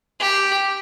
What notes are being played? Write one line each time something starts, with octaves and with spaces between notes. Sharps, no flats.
G4